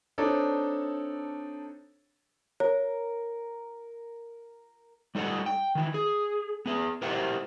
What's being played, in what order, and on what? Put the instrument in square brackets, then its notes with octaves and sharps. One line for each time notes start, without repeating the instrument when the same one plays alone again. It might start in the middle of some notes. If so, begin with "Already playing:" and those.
[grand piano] C4 D4 D#4 A4 C#5
[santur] A#4 [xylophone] C#5
[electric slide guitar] G3 D#4 A4 D5 F#5
G5
D#3 E3 E4
G#4
B3 G#4
E4 G4 A#4 C5 E5 F#5